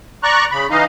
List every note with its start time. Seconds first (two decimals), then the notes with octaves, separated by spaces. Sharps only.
0.23 D5 A#5 C#6 F#6
0.51 C#3 B5
0.71 E3 D#4 D#5 F5